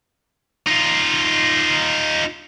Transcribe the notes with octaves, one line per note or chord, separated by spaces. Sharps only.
D#4 F4